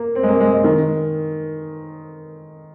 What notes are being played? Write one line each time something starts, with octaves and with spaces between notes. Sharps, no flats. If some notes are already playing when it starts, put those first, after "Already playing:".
Already playing: A#3
C4
G#3
A#3
G#3
G#3
D#3